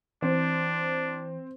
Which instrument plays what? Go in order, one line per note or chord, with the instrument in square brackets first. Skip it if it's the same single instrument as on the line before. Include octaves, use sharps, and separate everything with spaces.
[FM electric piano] E3 [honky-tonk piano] C4 [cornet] D4